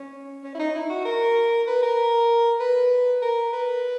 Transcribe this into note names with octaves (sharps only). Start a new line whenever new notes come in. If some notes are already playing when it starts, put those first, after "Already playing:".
Already playing: C#4
C#4
E4
D#4
E4
F#4
A#4
B4
A#4
B4
A#4
B4